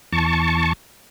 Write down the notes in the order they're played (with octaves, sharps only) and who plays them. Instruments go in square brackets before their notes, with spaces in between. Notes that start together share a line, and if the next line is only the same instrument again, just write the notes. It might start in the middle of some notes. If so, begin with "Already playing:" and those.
[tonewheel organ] E2 A5 C#6